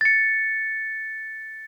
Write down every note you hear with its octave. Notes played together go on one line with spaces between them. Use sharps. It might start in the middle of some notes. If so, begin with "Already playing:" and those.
A6 C#7